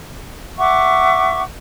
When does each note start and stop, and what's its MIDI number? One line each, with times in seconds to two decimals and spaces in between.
0.58 1.42 76
0.58 1.42 78
0.58 1.42 85
0.58 1.42 86